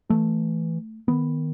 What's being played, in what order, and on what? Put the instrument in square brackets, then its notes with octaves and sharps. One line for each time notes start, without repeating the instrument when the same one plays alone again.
[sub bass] E3 [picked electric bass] A3
[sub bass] D#3 [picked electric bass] B3